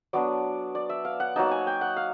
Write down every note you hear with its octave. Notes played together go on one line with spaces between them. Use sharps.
F#3 B3 D4 D5
D5
E5
F5
F#5
F#3 A#3 D#4 A5
G#5
G5
F#5
F5